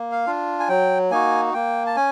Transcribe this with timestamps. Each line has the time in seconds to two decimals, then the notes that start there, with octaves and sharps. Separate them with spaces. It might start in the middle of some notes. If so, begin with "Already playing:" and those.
Already playing: A#3
0.12 F5
0.26 D4 F4
0.60 G#5
0.69 F#3 G5
1.11 A#3 D#4 F#4 G#5
1.54 A#3 G5
1.86 A5
1.96 C#4 G#5